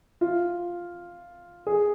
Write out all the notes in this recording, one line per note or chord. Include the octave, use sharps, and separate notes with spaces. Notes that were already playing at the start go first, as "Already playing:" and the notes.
F4
G#4